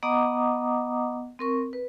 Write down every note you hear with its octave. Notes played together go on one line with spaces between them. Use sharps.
B3 D#5 F#5 A#5 D6 D#6
C4 A#4 C#6
B4